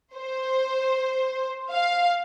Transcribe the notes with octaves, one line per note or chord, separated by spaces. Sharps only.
C5
F5